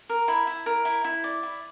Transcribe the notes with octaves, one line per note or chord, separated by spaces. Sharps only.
A#4
E4 B5
E4
A#4
E4
E4
D5
E4